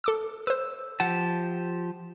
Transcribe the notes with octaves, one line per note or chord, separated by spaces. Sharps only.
A4 D6 E6
B4 C5 E6
F3 G4 F#5 A5